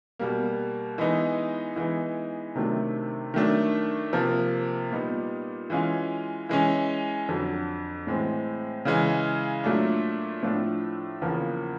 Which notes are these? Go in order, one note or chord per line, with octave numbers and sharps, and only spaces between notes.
B2 G3 A#3
E3 G#3 B3 D#4
E3 G#3 B3 D#4
C3 D#3 F#3 A3 D4
D#3 F#3 A3 D4
C3 F3 A#3
A#2 G3 B3 D#4
E3 G#3 C#4 F4
E3 G#3 C#4
F2 D3 F#3
A2 E3 G#3 C4
C#3 E3 G#3
A#2 F#3 A3 D4
A2 F3 A3 D4 F4
E2 C#3 F3 A#3